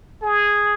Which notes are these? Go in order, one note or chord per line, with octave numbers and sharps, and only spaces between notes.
G#4